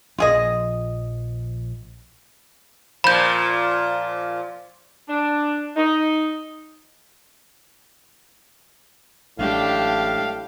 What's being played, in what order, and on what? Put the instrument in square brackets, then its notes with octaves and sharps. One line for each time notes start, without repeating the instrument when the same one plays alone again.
[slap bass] A#1 F3 [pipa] F4 G#4 D#5
[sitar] A#2 F3 [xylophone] B5 G6
[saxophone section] D4
D#4
[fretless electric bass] A1 F#3 G#3 [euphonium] A2 [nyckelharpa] D4 G4 [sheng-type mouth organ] F5